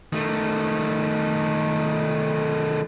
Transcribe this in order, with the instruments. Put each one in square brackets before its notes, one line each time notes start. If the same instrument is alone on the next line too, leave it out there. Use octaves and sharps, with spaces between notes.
[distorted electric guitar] D#3 A3